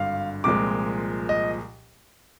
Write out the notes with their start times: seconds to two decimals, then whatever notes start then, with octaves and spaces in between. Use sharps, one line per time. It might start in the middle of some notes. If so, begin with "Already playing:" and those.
Already playing: G#1 G2 D3 F5
0.44 C2 A#2 F3 G#3 D6
1.29 D#5